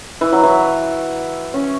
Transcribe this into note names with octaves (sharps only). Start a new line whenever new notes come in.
E3
F#3
E3
C#4